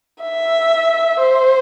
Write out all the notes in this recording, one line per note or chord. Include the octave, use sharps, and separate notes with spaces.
E5
C5